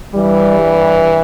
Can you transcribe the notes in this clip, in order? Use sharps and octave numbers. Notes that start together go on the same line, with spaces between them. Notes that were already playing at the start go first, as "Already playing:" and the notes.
G2 E3 G3
G3